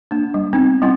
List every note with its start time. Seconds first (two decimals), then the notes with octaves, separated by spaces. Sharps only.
0.11 A#3 D4
0.34 G3
0.53 B3 C4 D#4
0.82 G3 C4 C#4 E4 F#5